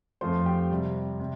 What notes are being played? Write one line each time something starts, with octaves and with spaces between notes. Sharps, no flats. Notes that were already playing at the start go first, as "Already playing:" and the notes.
F2 F3 A3 C5 C6
G4 G5
C3 G3
C3 G3